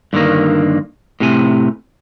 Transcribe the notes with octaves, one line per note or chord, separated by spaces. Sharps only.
G2 D3 D#3 A#3
A2 C3 G#5